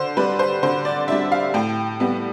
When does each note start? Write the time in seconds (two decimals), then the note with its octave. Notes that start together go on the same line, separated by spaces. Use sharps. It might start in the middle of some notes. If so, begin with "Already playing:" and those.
Already playing: D3 C5
0.17 G3 D4 B4
0.39 C5
0.63 D3 C5
0.85 D5
1.08 G3 D4 E5
1.32 F5
1.54 A2 G5
2.00 G3 B3